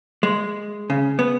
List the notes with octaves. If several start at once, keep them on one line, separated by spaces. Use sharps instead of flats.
G#3
C#3
B3